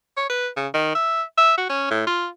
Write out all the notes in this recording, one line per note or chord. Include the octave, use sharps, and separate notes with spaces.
C#5
B4
C#3
D#3
E5
E5
F#4
C#4
A2
F4